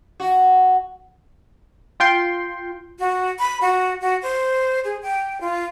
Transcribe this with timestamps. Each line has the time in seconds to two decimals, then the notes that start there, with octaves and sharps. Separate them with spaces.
0.20 F#4
2.00 F4 G5 C6
2.99 F#4
3.39 B5
3.61 F#4
4.01 F#4
4.22 C5
4.84 G#4
5.02 G5
5.41 F4